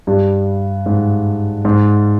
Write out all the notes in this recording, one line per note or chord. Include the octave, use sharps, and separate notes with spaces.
G2
G#2
G#2